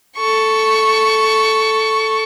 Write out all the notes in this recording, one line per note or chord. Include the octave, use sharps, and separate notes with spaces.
A4 C#6